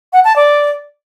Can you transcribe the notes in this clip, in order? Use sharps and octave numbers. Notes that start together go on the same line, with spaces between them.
F#5
A5
D5